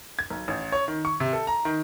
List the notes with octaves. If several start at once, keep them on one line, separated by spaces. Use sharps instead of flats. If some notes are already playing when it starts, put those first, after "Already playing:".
G#6
B1
A1
C#5
D#3
C#6
C3
A4
A#5
D#3